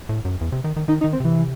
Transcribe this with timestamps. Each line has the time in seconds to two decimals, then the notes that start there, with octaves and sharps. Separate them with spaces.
0.09 A2
0.25 F#2
0.41 E2
0.52 C3
0.64 D#3
0.77 D#3
0.88 D#3 D#4
1.01 D#4
1.04 D#3
1.13 C4
1.20 C3 E3